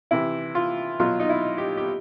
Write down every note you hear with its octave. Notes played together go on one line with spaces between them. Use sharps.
C3 E3 E4
F4
B2 F#3 F4
D#4
E4
G4
G4